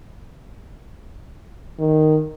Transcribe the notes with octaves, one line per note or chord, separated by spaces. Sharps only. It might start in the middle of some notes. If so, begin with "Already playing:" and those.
D#3